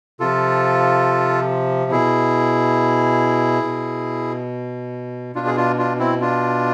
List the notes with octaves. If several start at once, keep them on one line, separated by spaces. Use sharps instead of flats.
C3 F3 F4 A4
B2 E4 G#4
B2
B2 D4 F4
G#4
D4 F4
D4 F4
C4 E4
D4 F4